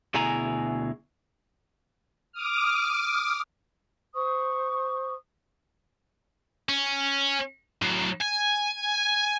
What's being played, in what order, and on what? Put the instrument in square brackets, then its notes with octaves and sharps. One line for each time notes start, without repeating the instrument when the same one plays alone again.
[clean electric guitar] D2 B2 E4 G#4 G#5 A#5
[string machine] D6 D#6 F6
[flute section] C5 C#6 D#6
[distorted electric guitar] C#4
A2 F#3
G#5